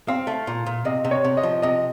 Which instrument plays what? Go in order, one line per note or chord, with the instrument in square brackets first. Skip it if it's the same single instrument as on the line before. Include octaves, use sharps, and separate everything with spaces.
[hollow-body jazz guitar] C4 [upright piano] F5
[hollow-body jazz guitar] A3
A#2
A#2
[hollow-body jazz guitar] C3 [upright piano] D#5
[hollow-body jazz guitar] C3
[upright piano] C#5
[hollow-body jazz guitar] C3
[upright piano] D#5
[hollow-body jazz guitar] F3
[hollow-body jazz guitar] C3 [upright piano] D#5